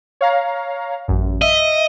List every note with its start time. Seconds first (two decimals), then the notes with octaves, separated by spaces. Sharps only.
0.21 C#5 F5 A#5
1.08 A1 F#2
1.42 D#5 E5